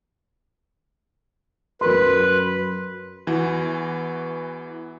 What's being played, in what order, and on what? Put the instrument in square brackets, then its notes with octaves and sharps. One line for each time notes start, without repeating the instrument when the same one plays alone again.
[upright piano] F#2 A#4 C6 [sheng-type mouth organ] B4
[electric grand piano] E2 E3 F#4